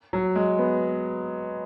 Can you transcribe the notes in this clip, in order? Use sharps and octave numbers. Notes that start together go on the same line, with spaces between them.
F#3
G#3
B3